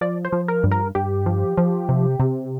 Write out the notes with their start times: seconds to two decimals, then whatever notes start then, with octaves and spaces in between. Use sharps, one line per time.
0.01 F3 D5
0.25 C5
0.32 F3
0.48 A#4
0.63 G2
0.71 A#4
0.95 G2 G4
1.26 F3
1.57 F3
1.89 C3
2.20 C3